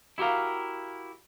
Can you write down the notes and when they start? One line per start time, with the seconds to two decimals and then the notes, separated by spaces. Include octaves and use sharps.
0.18 E4 F#4 G4 A#4 F5